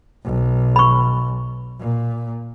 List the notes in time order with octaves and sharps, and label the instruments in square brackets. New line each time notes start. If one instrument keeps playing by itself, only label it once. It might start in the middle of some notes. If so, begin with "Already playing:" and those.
[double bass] B1
[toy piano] B5 C#6
[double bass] A#2